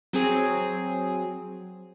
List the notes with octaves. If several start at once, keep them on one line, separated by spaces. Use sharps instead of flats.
F#3 C4 G#4